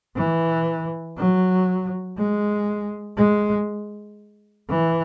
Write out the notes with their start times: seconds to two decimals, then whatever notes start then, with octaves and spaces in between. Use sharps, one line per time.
0.16 E3
1.17 F#3
2.18 G#3
3.17 G#3
4.68 E3